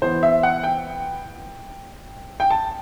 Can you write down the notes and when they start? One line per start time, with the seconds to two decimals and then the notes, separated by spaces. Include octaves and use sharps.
0.02 E3 B3 C5
0.23 E5
0.43 F#5
0.63 G5
2.40 G5
2.50 A5